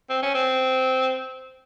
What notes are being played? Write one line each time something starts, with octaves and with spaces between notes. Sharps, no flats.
C4
C#4
C4